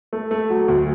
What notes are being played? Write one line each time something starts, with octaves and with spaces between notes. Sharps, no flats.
A3
A3
F#3
D2